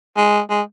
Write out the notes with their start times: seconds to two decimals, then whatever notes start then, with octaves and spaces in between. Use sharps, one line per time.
0.17 G#3
0.50 G#3